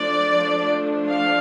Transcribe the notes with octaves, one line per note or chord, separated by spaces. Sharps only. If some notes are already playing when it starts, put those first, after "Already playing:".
Already playing: F3 A3 D4 D5
F5